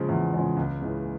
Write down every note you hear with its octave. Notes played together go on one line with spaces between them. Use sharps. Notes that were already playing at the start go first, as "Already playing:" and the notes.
Already playing: C#3 F3 G#3
E2
C#3 F3 G#3
C#2
C#3 E3 G#3